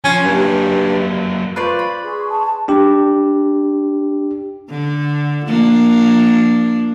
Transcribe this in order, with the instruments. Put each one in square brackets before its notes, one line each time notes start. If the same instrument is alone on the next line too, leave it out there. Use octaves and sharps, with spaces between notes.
[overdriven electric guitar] F3 [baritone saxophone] C#4
[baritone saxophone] G2 [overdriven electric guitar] F#3 A#3
[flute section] F4 C6 C#6 [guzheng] B4 C5 D5
[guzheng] B5
[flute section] G#4 C6 C#6
[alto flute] A5
[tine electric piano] D4 G4
[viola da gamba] D3
F3 A#3 D4